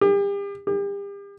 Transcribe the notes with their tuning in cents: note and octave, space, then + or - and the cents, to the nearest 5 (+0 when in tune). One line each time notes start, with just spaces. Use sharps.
G4 +40
G4 +40